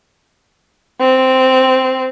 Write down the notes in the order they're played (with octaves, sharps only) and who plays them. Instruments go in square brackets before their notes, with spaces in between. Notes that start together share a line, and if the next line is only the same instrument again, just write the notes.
[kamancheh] C4